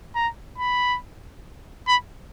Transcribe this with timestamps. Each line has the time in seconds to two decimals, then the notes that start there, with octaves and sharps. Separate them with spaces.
0.15 A#5
0.58 B5
1.88 B5